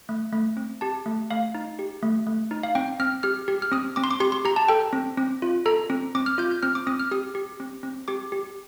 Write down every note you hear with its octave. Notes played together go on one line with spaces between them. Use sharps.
A3
A3
C4
G4 A5
A3
A3 F5
D#4
G4
A3
A3
D#4
F5
C4 G5
C4 F6
G4 F6
G4
F6
C4 D#6
C4 D6
C6
D6
G4 C6
C6
G4 A#5
A5
A4 G5
C4
C4
F4
A4 A#5
C4
C4 D6
F6
F4 G6
G6
C4 F6
D6
C4 D#6
F6
G4 D#6
G4
C4
C4
G4 D6
G4